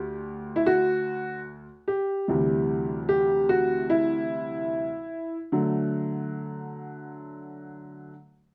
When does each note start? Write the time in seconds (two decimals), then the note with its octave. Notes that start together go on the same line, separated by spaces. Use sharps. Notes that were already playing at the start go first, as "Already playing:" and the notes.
Already playing: D2 G4
0.56 E4
0.66 F#4
1.88 G4
2.28 D2 C3 E3 G3
3.09 G4
3.49 F#4
3.90 E4
5.52 D3 F#3 A3